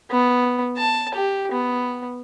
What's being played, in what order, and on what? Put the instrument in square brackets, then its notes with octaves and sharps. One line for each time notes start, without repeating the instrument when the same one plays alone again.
[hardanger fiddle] B3
A5
G4
B3